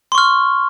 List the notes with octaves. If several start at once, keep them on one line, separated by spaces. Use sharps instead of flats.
C6 C#6 F6